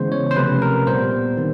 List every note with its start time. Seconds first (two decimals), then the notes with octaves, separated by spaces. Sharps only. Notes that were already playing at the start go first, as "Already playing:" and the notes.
Already playing: C#3 E3 G#3 B3 C5
0.12 C#5
0.31 C5
0.36 C3 F3 A3 C#4 B4
0.62 A#4
0.87 A#2 G3 B3 C5
1.37 D#3 G3 C4